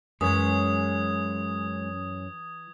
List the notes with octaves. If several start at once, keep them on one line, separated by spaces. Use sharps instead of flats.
F#2 E3 G#3 C#4 G#4 D#6 G#6